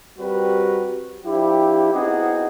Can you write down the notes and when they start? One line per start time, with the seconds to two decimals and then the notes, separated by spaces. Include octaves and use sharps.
0.19 G3 C4 F#4 G4 A#4 B4
1.25 F3 D4 E4 G4
1.93 B3 C4 D#4 E4 F#4 G#4